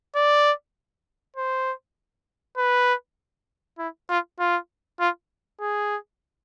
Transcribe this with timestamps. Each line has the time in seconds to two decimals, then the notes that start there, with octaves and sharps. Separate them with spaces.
0.16 D5
1.36 C5
2.58 B4
3.79 E4
4.09 F4
4.39 F4
5.00 F4
5.61 G#4